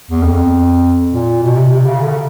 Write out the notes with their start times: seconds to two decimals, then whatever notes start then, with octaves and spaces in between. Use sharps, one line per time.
0.11 E2
0.23 F2
1.12 A#2
1.42 B2
1.57 C3
1.72 C3
1.86 C#3
2.01 D3
2.08 C#3